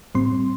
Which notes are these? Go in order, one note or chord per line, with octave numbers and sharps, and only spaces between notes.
A2 G3 C4 C6